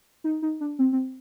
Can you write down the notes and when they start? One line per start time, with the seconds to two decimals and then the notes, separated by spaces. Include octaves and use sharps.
0.24 D#4
0.42 D#4
0.61 D4
0.79 C4
0.93 C4